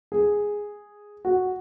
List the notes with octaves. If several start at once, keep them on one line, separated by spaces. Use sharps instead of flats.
G#4
F#4